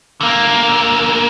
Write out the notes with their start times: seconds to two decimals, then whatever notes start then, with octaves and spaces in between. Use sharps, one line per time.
0.21 D3 A#3